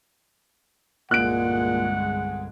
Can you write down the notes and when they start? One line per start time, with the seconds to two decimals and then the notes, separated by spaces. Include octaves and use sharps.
1.11 G1 C2 A#2 G#3 F#5 F#6 D7